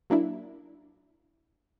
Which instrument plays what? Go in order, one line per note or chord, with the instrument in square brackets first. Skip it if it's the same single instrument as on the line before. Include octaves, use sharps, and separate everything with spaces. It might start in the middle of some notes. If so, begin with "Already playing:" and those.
[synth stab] F#3 A#3 D4 E4